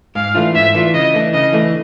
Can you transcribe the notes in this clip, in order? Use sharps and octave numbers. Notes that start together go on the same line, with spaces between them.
G#2 F5
E3 A3 D4 F4
G#2 E5
E3 A3 D4 F4
C#3 D#5
E3 A3 D4
C#3 D#5
E3 A3 D4